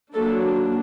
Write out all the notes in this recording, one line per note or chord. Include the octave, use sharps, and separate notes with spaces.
F#3 A#3 D4 A4